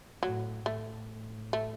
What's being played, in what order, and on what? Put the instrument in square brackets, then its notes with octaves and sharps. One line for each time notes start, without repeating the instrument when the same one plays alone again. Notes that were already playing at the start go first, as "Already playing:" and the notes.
[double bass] A2 [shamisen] F#3
[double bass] A2 [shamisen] A3
[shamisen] A3